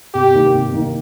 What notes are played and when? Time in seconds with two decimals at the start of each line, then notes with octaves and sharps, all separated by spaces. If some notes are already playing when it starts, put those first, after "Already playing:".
0.14 C3 G4
0.35 D#3 A#3 D#4
0.55 C3
0.74 D#3 A#3 D#4